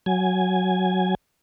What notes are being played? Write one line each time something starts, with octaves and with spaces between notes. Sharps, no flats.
F#3 G#5